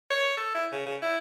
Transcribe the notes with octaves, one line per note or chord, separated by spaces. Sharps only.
C#5
A4
E4
C#3
C#3
E4